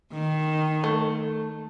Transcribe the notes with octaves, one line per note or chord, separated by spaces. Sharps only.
D#3
A3